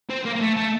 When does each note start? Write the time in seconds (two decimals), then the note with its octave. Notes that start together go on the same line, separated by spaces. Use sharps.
0.10 C4
0.25 A#3
0.35 A#3
0.41 A3
0.56 A3